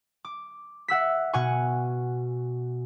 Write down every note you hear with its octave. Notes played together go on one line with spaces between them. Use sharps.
D6
E5 F#5 E6 B6
B2 F#5 G#5 C#6